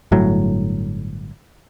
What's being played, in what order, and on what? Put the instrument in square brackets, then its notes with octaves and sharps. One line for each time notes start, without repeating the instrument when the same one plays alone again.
[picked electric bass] G1 A2 F#3